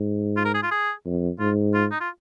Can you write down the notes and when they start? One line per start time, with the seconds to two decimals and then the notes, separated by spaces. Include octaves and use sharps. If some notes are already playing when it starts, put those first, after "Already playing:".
Already playing: G#2
0.37 F4
0.45 A#4
0.54 G#4
0.63 F4
0.71 G#4
1.06 F2
1.40 G#2 F4
1.74 F4
1.91 D#4
2.00 F4